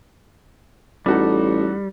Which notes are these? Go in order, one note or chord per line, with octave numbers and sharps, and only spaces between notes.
A1 G3 D#4 F#4 A4